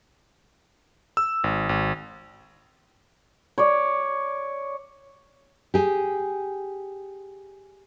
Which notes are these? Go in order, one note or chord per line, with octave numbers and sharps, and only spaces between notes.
E6
G#1
G#1
C#5 D5
G4 G#4